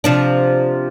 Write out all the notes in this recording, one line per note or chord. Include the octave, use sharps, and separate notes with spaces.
C3 F3 D4